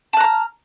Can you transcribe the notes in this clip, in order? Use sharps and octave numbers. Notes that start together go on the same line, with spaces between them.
A5 A#5 F6 F#6